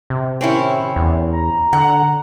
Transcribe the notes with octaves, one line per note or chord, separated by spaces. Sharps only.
C3
A2 D#3 C4 C#4 E4
E2
A#5
D3 F#5